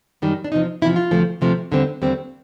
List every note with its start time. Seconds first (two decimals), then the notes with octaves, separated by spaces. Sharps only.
0.22 F#2 D#3 G3
0.44 D4
0.52 E2 C3 F3 D#4
0.82 E2 C3 F3 E4
0.96 F4
1.11 D2 C3 F3 A3
1.41 D2 C3 F3 A3
1.71 D#2 D3 G3 C4
2.02 D#2 D3 G3 C4